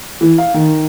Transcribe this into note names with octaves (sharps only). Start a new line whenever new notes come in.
E3
F5
D#3